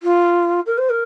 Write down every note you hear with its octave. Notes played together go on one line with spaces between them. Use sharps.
F4
A#4
C5
A#4